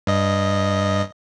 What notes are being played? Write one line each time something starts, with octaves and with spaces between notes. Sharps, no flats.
G2 D#5